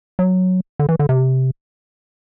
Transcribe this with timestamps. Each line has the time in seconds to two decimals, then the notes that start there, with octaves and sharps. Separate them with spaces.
0.19 F#3
0.79 D3
0.89 E3
0.99 D3
1.09 C3